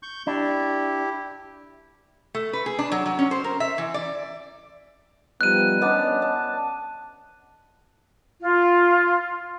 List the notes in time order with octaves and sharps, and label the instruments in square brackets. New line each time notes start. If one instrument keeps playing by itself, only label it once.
[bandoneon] C#6 G6
[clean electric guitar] D4 [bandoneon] E4 G4
[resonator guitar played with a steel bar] A3
B4
G#4
D4
F#3
F#3
C#4
C5
A#4
E5
E3
D5
[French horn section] F3 G3 B3 [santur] D#4 [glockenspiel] F#6 D#7
[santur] B3 D4 [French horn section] C#4 D#5
[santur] A5
[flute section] F4